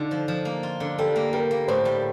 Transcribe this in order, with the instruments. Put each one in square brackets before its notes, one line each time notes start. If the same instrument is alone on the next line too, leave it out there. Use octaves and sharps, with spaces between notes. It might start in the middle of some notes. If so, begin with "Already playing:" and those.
Already playing: [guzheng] D3 F4 [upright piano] D#4
[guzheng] F3
F3
A#3
F4
D3
[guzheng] G3 [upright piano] A4
[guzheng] A#3
[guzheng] G3 [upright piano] A#4
[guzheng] A#3
[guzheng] A2 [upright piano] C5
[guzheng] G3